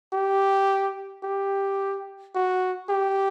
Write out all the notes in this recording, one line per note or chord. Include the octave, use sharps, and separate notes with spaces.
G4
G4
F#4
G4